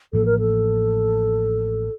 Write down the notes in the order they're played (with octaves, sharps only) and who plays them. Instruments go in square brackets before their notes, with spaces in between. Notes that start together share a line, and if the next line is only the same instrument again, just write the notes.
[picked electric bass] A1 A2 F3 A#3 [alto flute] A4
[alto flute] A#4
A4